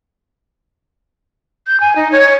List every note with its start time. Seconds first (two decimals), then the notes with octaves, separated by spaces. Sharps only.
1.67 G6
1.80 G#5
1.96 D#4
2.12 C#5